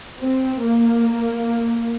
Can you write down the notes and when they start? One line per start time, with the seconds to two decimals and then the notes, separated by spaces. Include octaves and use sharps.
0.22 C4
0.63 A#3